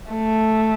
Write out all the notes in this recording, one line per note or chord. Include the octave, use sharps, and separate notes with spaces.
A3